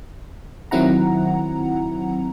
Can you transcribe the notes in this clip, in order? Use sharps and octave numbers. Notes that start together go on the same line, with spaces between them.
D#3 F#3 C4 E4 F#5 A#5